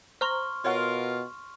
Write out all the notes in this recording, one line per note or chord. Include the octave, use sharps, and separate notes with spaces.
C5 A#5 C6 C#6 F6
B2 F4 A#4 C#5 F#5